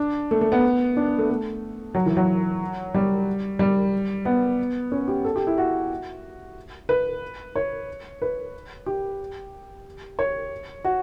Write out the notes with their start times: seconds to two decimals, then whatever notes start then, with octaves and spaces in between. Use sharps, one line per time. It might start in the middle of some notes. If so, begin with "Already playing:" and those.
Already playing: D4
0.31 A3
0.41 A3
0.52 B3
0.97 D4
1.18 A3
1.30 A3
1.95 F#3
2.06 E3
2.17 F#3
2.94 G3
3.59 G3
4.25 B3
4.92 C#4
5.08 G4
5.25 A4
5.36 G4
5.47 E4
5.58 F#4
6.89 B4
7.55 C#5
8.22 B4
8.86 G4
10.19 C#5
10.84 F#4